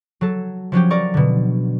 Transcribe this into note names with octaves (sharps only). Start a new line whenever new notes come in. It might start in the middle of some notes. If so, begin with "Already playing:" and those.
F#3 A4
F3 F#3 C#4 G4
A#4 D5 C#6
B2 D3